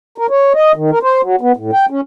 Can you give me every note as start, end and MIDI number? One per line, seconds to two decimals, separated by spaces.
0.18 0.27 70
0.30 0.53 73
0.54 0.72 75
0.76 0.91 51
0.91 0.99 70
1.03 1.21 72
1.22 1.36 54
1.41 1.52 59
1.56 1.71 45
1.73 1.86 79
1.90 2.01 61